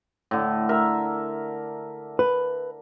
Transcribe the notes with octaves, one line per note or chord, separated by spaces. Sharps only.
A2 D3
A#4 E5
B4